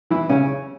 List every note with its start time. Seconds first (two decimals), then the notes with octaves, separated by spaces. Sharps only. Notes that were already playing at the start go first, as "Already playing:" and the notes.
0.10 E3 E4
0.29 C#3 C#4